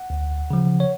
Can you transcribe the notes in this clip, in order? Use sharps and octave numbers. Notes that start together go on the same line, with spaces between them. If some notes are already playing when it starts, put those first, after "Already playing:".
Already playing: F#5
D2
C#3 F3
C#5